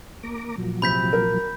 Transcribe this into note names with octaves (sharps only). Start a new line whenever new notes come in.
A#3 A#5 D6
A#2 F3 F#3
C3 C4 B5 G6 B6
A#4